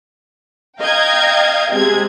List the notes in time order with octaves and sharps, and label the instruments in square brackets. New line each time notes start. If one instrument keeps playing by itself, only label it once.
[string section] D#5 F5 G5 A#5 G6 G#6
C3 G#3 G#4 G#6